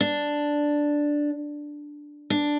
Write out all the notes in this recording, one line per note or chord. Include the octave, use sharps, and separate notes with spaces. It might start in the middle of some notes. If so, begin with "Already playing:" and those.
D4
D4